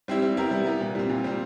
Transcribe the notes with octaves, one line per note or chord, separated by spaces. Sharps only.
G3 C4 E4 G4
G3
B3 E4 G4 A#4
G3
B3 E4 G4 A#4
A#2
G3 C4
A#2
G3 C4